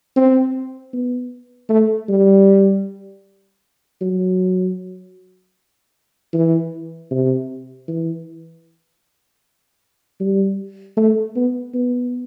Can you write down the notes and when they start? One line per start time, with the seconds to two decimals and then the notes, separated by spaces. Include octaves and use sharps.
0.16 C4
0.93 B3
1.70 A3
2.09 G3
4.02 F#3
6.34 E3
7.11 C3
7.88 E3
10.20 G3
10.97 A3
11.36 B3
11.74 B3